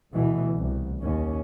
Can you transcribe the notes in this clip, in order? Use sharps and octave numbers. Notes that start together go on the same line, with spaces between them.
D2 B2 E3
C2
D#2 C#4